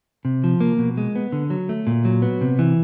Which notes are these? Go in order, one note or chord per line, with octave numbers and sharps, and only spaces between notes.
C3
F3
A#3
B2
G#3
B3
D3
F#3
A3
A#2
F#3
B3
C3
E3